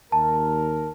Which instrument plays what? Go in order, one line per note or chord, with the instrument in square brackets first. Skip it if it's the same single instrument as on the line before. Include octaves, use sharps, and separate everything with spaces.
[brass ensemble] D#2 A#4 [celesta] A5